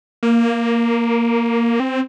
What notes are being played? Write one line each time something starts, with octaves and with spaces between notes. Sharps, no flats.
A#3
C4